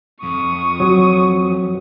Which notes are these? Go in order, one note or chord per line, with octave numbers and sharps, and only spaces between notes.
F2 C#6 D#6
F#3